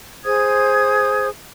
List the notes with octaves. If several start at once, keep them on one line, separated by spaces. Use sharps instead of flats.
G#4 C5 D#6 G#6